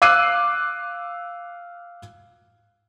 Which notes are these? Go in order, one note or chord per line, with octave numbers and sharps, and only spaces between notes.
F5 D6 E6 F#6 C7 D#7